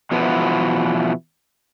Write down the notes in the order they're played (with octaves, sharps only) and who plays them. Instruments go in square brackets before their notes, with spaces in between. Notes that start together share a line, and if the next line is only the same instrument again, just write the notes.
[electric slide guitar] B2 E3 F3 B3